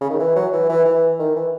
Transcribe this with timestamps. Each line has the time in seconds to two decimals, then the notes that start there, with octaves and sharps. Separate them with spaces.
0.01 C#3
0.10 D#3
0.19 E3
0.36 F#3
0.53 E3
0.69 E3
0.85 E3
1.19 D#3
1.36 E3